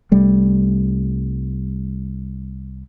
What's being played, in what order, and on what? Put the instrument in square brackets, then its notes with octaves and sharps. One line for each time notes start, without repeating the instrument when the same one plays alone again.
[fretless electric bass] C2 G3 A3